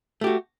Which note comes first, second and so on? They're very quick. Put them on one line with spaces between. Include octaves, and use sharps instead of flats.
A3 G4 F#4